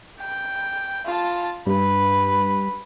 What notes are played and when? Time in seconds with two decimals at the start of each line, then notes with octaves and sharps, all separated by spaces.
0.19 G5
1.06 F4 A5
1.67 G2 B4